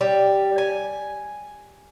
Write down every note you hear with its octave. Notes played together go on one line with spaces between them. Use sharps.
G3
G#5